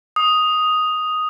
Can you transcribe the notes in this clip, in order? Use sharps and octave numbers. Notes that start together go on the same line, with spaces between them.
D#6